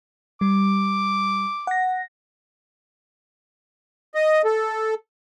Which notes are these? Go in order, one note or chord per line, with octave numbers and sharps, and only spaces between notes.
G3 D6
F#5 A#6
D#5
A4